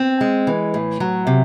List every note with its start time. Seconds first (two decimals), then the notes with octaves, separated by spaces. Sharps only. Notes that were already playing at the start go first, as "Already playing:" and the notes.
Already playing: C4
0.21 G#3
0.47 E3
0.74 A2
1.00 F#3
1.27 C3